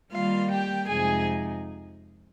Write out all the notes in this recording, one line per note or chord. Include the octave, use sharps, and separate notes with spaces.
D#3 G3 A#3 F4 F5
G4 G5
F2 C3 F3 G#3 D#4 G#4 G#5